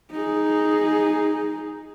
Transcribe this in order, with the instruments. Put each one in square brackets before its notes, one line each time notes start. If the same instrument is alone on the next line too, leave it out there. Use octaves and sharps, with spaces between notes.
[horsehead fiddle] D#4 G#4